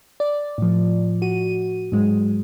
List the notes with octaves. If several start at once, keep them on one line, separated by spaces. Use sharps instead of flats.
D5
A2 F3
F#4 D#7
G#2 F#3 G#3